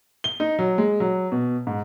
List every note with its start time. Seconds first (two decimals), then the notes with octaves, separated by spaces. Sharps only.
0.24 G7
0.40 D#4
0.59 F#3
0.78 G#3
1.00 F#3
1.32 B2
1.67 G#2